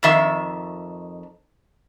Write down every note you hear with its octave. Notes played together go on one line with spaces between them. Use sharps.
F2 D#3 E5